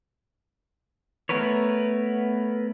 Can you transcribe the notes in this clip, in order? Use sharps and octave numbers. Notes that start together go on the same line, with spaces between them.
A3 B3 A#4 B4 C#5